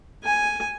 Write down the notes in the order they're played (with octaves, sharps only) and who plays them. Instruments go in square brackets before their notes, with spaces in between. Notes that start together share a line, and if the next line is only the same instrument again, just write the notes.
[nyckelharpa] G#5